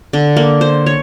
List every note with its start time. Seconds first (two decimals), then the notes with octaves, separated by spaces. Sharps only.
0.13 D3
0.37 A#3
0.61 C5
0.86 C#5